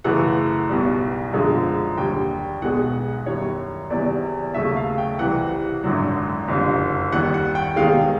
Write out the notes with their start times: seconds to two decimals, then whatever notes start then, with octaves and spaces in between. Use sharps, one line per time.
0.04 F#2 C#3 E3 A3 F#5
0.69 B1 B2 G3
1.33 F#2 D3 F3 G#3
1.97 D#2 D3 G3 G5
2.62 B1 B2 G#3 F#5
3.26 F#2 D#3 G3 C#5
3.90 E2 C3 D#3 F#3 D5
4.54 D#2 C#3 F#3 A3 E5
4.77 F5
4.98 G5
5.19 C2 C3 E3 F#5
5.84 G#1 F#2 D3 F#3
6.48 F#1 F2 D3 G3
7.12 D#2 D#3 G3 F#5
7.34 F#5
7.55 G5
7.76 E2 C3 D#3 G#3 F5